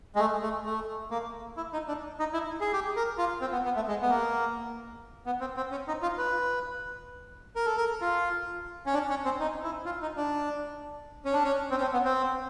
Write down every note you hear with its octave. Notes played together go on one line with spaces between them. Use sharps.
G#3
A3
A3
A3
A#3
E4
D#4
D4
D#4
E4
G#4
G4
A#4
F4
C4
B3
B3
A3
G#3
B3
A#3
B3
C4
C4
C#4
D#4
F4
B4
A#4
A4
A#4
F4
C#4
D4
C#4
C4
D#4
E4
F4
D#4
D4
C#4
D4
C#4
C4
C#4
C4
B3
C4